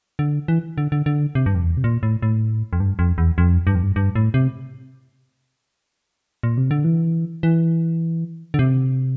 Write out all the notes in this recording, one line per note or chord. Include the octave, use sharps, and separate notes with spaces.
D3
E3
D3
D3
D3
C3
G2
F2
E2
C3
A#2
A2
A2
F2
G2
F2
E2
F2
G2
F2
G2
G2
A2
C3
A#2
C3
D3
E3
E3
D3
C3